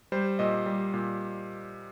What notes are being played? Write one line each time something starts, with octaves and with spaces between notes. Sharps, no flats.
G3 C5
A#2 D#5
G3
A#2